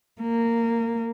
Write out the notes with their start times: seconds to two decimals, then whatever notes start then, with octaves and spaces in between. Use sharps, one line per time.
0.22 A#3